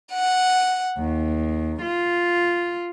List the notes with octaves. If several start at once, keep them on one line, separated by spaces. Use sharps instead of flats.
F#5
D#2
F4